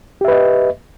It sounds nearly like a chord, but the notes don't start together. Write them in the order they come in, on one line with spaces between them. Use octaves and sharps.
G4 E5 B4 D#5